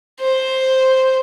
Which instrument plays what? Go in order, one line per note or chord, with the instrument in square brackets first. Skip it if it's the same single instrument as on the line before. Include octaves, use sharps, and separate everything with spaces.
[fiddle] C5